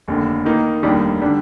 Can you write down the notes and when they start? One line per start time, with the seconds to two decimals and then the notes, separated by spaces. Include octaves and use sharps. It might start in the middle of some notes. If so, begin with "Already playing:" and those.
0.08 F1 D#2 D3
0.45 D#3 A#3 D#4
0.83 F1 D#2 D#3 G3 D4
1.22 D3 G3 D4